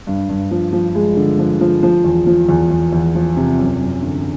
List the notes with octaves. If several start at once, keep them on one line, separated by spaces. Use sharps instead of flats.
G2
G2
F3
F3
G#3
D3
F3
F3
F3
E2
F3
E2
E2
E2
F3
C3
F#2
F#2
D3